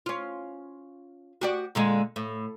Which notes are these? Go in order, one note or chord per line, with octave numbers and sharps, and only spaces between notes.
C#4 F4
F#4 G4 D5
A#2 D3 G#3
A2